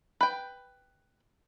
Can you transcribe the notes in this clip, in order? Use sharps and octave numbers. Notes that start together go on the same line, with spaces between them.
B4 G5